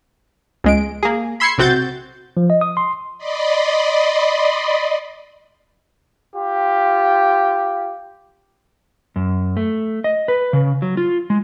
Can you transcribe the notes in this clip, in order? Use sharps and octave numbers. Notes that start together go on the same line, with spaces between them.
C#2 G#3 D7
A#3 G#4
B5 C6 E6 G#6 C7 C#7
B1 C3 C4 F#4 G6 A6
F3
D#5
D#6
C6
D5 D#5 B5 C6
F4 G4
F#2
A3
D#5
B4
C#3
F#3
F4
G#3